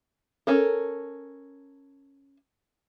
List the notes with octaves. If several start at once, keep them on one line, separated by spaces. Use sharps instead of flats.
C#4 A4 A#4